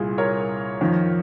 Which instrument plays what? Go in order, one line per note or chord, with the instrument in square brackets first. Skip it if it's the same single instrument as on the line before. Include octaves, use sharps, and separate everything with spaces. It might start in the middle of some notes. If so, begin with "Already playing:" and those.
Already playing: [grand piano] C2 A#2 G#4
A#4 C#5
F2 D#3